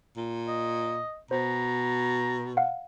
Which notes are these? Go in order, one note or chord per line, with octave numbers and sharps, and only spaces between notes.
A#2
D#5
B2 C5 A#5
F5 F#5